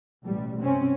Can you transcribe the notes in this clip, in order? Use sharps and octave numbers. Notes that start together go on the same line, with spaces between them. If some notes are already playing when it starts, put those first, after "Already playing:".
A1 B2 G3
G2 C3 C4 C#4